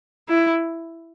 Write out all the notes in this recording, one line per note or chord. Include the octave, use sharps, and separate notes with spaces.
E4